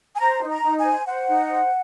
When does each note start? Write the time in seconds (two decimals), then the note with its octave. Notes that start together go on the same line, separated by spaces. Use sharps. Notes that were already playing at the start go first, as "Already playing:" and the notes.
0.15 G#5
0.20 C5 A#5
0.41 D#4
0.49 A#5
0.63 D#4
0.78 G#5
0.84 C5
1.07 C5 F#5
1.28 D#4
1.49 C5